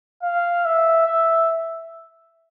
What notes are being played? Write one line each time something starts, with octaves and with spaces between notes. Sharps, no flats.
F5
E5
E5